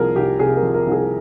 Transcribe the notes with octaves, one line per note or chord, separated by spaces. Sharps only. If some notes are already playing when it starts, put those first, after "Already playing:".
Already playing: C2 F3 G#4 A#4
C2 G4
C3 G#4
A#4
F3
A#4
C2
G#4